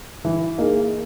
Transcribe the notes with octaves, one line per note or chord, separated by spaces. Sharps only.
E3
A#3 D#4 G#4